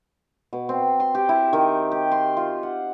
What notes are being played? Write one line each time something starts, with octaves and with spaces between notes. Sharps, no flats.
B2
C4
C6
G4
E4
D#3
G4
C6
F4
F#5